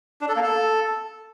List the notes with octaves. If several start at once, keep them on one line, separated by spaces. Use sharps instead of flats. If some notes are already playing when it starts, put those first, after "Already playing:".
D4
A4
A#3
A4